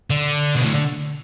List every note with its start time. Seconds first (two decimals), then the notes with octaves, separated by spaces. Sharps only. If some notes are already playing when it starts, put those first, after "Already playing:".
0.10 D3
0.55 B2
0.64 A2